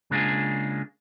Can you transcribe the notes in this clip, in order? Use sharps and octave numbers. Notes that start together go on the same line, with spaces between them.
C#3 G#3 A#3 D4 F4 G#4